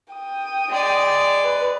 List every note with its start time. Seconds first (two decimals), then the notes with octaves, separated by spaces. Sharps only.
0.13 G5 D#6
0.69 G#3 D5
1.44 B4